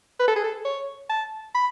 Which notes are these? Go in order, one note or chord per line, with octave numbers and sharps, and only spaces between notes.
B4
A4
G#4
A4
C#5
A5
B5